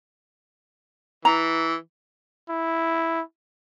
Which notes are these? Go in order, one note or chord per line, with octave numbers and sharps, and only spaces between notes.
E3 A#5
E4